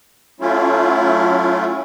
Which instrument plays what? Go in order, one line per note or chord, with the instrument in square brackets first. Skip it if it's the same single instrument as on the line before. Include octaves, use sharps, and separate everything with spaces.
[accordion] F#3 A3 C#4 E4 F4